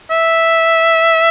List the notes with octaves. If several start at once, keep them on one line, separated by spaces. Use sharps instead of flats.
E5